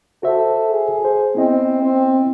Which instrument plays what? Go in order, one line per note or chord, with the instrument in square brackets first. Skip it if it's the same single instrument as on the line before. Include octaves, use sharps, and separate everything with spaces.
[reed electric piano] F#4 C5 E5 [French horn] A4
[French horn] G#4
[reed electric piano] C5
[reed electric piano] B3 E4 D#5 [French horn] C4
[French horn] C4